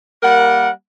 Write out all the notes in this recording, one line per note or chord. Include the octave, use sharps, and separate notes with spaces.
G3 A#3 A#4 F#5